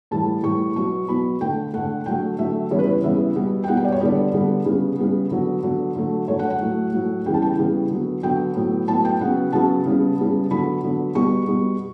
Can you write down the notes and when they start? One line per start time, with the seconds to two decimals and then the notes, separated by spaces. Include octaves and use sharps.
0.11 A2 E3 G3 A5
0.43 A2 E3 G3 C#6
0.75 B2 F#3 B3 C#6
1.08 B2 F#3 B3 B5
1.41 D3 A3 G5
1.73 D3 A3 F#5
2.06 D3 F#3 A3 G5
2.39 D3 F#3 A3 E5
2.71 C#3 E3 G3 B3 C#5
2.79 B4
2.86 C#5
3.04 C#3 E3 G3 B3 E5
3.36 B2 G3 B3
3.64 G5
3.68 B2 G3 B3 F#5
3.77 G5
3.85 D5
3.92 C#5
4.01 D3 G3 B3 D5
4.33 D3 G3 B3
4.66 C#3 G3 B3
4.98 C#3 G3 B3
5.31 D3 F#3 B3
5.63 D3 F#3 B3
5.96 D3 F#3 A3
6.28 D3 F#3 A3 C#5
6.39 F#5
6.50 F#5
6.61 A2 F#3 A3
6.93 A2 F#3 A3
7.26 C#3 E3 G3 B3 G5
7.34 A5
7.42 G5
7.58 C#3 E3 G3 B3
7.90 D3 F#3 B3
8.23 D3 F#3 B3 G5
8.56 A2 F#3 B3
8.88 A2 F#3 B3 A5
9.05 G5
9.21 C#3 F#3 B3 F#5
9.53 C#3 F#3 B3 A5
9.85 C#3 G3 B3
10.19 C#3 G3 B3
10.51 D3 F#3 B3 B5
10.83 D3 F#3 B3
11.15 B2 G3 B3 C#6
11.48 B2 G3 B3